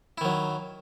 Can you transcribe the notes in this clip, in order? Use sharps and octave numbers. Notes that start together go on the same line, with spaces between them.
D#3 F#3 E4